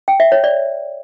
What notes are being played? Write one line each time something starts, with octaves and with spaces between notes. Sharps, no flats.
G5
E5
C#5
D5